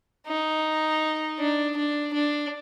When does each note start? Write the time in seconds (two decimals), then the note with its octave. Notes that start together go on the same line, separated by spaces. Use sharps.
0.27 D#4
1.40 D4
1.76 D4
2.14 D4